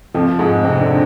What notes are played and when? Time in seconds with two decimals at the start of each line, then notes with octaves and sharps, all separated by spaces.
0.14 F2 F3
0.39 G#2 G#3
0.64 C3 C4
0.81 D3 D4